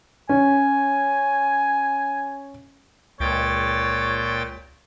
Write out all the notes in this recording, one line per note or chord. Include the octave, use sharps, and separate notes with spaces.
C#4 G#5
C#2 A#2 C#5 G5 A6